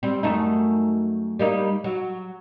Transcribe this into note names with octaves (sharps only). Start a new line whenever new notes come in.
G3 C4
F#2 A3 D#4
G3 A#3 D#4
F#3